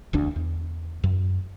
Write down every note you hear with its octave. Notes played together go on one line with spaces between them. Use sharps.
E1 D2 D4
E2
F#2